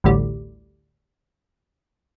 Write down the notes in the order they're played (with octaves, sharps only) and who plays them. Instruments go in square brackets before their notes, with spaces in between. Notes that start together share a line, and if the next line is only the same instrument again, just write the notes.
[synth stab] A1 D2 G3